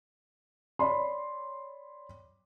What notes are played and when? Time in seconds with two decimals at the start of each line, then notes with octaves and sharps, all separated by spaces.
0.79 C#5 D5 B5 C6